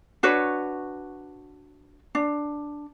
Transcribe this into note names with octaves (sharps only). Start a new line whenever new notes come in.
D4 F#4 B4 C#5
D4